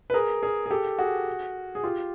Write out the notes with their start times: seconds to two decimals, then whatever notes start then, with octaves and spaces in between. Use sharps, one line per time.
0.10 B4
0.14 G#4 A#4
0.43 G#4 A#4
0.66 G#4
0.71 G4 A4
0.99 F#4 G#4
1.75 G#4
1.84 F4 G4